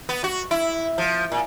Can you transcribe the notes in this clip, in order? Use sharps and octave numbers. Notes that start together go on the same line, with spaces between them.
B3
F#4
E4
F3
A#2